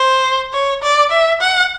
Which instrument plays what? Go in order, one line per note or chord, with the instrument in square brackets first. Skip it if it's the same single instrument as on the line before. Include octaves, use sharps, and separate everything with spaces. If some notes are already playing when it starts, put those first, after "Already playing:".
Already playing: [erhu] C5
C#5
D5
E5
F#5